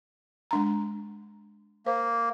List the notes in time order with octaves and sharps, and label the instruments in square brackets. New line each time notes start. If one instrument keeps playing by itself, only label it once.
[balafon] G#3 D4 A#5
[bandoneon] A#3 [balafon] C5